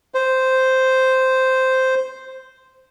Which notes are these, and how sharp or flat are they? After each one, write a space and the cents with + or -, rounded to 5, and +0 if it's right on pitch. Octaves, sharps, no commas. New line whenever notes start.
C5 -5